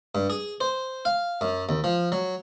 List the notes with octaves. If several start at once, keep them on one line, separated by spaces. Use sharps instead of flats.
G2
G#4
C5
F5
F#2
D#2
F3
F#3